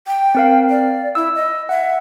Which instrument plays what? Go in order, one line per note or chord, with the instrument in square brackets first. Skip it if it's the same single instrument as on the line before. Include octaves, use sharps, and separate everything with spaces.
[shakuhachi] G5
[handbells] C4 A#4 F5
[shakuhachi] D5
[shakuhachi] E4 [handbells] E6
[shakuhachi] D#5
[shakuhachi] E5 [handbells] F#5